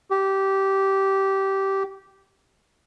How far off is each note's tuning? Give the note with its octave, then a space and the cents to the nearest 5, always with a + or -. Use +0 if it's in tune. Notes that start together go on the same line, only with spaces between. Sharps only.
G4 -15